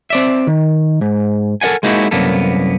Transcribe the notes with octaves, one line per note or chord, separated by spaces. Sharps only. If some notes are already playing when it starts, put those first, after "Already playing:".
C4 D5 E5
D#3
G#2
A4 A#4 D#5 F#5 G#5
G#3 A#3 D#4 E4 F#4
C2 F#2 A#3 B3 A4